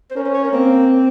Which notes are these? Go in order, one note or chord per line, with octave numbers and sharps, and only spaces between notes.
C5
C#4 A#4
C5
C#5
A#4
A#3 C4